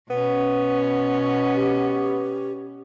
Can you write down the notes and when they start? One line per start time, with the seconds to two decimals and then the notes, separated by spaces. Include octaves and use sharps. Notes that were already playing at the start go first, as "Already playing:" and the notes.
0.10 B2 B3 C#4
1.54 G4